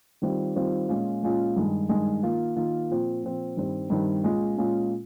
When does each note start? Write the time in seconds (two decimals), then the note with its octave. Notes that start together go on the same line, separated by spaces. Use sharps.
0.22 D#3 G3 C4 F4
0.56 D#3 G3 C4 F4
0.89 A#2 G#3 C#4 F4
1.23 A#2 G#3 C#4 F4
1.56 G2 D#3 G#3
1.89 G2 D#3 G#3
2.23 D#3 A#3 F4
2.56 D#3 A#3 F4
2.90 A#2 F3 C4
3.23 A#2 F3 C4
3.57 G2 D#3 G3 C4
3.90 G2 D#3 G3 C4
4.24 A#2 G#3 C#4 F4
4.57 A#2 G#3 C#4 F4